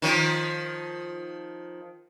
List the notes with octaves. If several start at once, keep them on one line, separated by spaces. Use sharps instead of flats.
D#3 F3